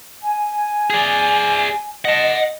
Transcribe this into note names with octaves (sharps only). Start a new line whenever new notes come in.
G#5
G#4 D5
D#5 F#5 A5